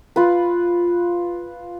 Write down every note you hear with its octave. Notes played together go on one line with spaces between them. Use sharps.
F4 B4